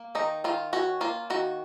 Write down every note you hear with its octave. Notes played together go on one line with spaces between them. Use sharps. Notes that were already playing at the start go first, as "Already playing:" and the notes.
Already playing: A#3
D#3 D#4
D#3 F4
C#4 F#4
A#3 F4
D#3 F#4